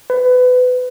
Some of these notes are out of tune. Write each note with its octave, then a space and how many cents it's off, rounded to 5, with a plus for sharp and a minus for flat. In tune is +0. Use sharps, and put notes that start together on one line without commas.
B4 +25